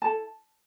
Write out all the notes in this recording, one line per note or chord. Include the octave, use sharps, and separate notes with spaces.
E4 A4 A5